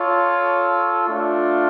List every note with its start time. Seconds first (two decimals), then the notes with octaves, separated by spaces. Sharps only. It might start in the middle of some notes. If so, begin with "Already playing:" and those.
Already playing: F4 A4 C#5
1.07 A3 D4 F4